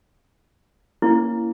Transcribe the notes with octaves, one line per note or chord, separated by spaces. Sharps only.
A#3 C#4 E4